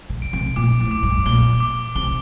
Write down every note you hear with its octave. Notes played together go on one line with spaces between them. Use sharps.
C3
D7
C3
A#2 D6
A2
D6
G2
A#2 G7
D6
C3 G7